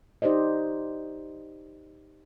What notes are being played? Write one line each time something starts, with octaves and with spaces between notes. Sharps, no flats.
D#4 G4 C5 D5 D#5